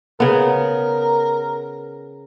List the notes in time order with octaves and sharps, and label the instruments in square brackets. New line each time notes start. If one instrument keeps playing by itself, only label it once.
[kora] C#3 B3 [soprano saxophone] A#4